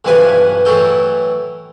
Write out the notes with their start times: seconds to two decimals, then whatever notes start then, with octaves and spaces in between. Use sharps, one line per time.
0.05 B1 G2 E3 F3 B4 G#5
0.65 A2 E3 F#3 A4 G5